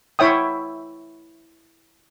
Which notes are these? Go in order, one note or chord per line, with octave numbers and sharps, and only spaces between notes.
E4 C#5 E5 G5 D#6